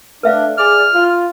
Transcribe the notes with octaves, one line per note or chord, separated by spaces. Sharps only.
A3 D4 B4 E5 F5
G#4 D5 F6
F4